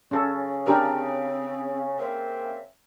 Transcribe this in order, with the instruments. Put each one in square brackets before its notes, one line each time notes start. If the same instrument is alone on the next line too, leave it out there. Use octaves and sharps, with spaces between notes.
[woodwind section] C#3 [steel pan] C#4 A4
[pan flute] C4 [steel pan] D4 G4 A#4
[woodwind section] C#3 A#3 C4 [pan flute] E5